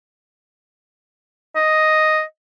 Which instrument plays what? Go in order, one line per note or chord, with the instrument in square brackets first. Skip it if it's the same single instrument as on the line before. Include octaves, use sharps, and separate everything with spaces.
[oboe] D#5